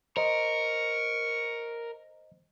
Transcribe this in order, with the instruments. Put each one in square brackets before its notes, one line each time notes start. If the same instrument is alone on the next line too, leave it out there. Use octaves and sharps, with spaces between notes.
[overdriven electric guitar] A#4 [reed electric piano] C5 D#5 [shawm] C#6